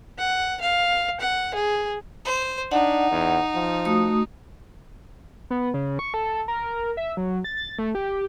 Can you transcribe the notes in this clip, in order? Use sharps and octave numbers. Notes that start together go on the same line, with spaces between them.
F#5
F5
F#5
G#4
C5
D4 D#4 F#5
E2
F3
A3 F#4 D#6
B3
C#3
C#6
A4
A#4
E5
F#3
A6
A3
G4